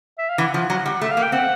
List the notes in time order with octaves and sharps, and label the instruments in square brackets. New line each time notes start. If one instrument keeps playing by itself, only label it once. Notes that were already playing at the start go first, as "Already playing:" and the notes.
[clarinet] E5
F5
[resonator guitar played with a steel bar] E3 [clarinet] F#5
[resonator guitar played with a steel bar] F3 [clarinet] F#5
[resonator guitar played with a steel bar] F#3 [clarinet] F#5
[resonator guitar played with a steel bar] G3 [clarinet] F#5
[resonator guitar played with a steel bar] A3 [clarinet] E5
[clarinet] F5
[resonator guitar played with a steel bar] A#3
[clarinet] G5
[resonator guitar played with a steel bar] C4 [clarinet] F#5